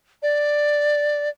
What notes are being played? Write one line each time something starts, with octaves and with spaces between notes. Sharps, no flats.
D5